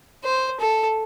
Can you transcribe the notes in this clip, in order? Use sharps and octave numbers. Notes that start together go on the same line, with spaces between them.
C5
A4